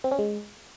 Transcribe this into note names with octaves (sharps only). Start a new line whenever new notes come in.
C4
C#4
G#3